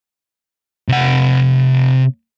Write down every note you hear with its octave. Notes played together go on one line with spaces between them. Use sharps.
C3 F#5